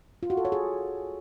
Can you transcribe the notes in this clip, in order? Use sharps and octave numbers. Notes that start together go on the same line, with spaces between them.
F4
F#4
A4
C#5
G#4